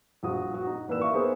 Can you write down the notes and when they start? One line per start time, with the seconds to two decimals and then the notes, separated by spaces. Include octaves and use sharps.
0.23 A#1 G2 F4 F#4 D#6
0.54 F#4
0.67 D#4
0.88 A1 A#3 B4 D5 E6 E7
1.02 A#4 E5 F5 C#6
1.13 B3 D#4 G#4 B4 C5